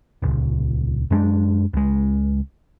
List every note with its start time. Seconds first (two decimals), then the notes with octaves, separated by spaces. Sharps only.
0.22 D#1 C#2
1.11 F#2 G#3 D4
1.73 C#2 G#3